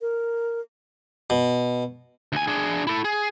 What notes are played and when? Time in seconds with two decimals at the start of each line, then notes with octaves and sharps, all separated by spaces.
0.01 A#4
1.30 B2
2.32 D2 G#5
2.48 D4 G#4
2.87 E4 A4
3.04 G#4